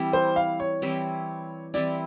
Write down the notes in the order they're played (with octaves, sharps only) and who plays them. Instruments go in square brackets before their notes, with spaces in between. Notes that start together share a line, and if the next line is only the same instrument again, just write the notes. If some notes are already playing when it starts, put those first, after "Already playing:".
Already playing: [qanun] E3 G3 C4 E4
[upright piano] C5
F5
C#5
[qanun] E3 G3 C4 E4
[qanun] E3 G3 C4 E4 [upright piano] D5